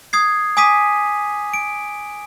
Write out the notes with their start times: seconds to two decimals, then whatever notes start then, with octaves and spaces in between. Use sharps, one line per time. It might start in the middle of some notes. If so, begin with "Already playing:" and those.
0.13 D#6 G#6 C7
0.57 G#5 D6 D#6 B6 D#7
1.54 D7